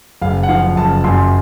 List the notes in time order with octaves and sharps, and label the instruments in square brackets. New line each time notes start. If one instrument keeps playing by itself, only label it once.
[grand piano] F#1 F5
F#5
F3 F5
F#1 A5
F#2 C6